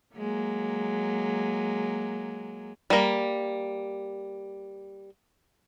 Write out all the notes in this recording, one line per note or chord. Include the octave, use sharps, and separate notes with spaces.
F#3 G#3 A#3
G3 A#3